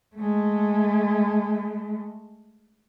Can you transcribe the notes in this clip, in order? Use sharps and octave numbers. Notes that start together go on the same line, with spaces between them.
G#3 A3